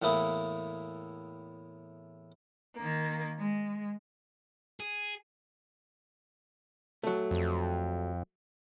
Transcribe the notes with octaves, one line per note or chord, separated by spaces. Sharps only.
E2 A2 A#3 E4 D#6
D#3 A#3
G#3
G#4
F#3 A3
F2